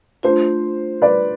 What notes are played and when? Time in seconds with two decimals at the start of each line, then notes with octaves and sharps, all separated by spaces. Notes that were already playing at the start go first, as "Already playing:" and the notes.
0.23 A3 D4 F4 C5
1.02 B4 D5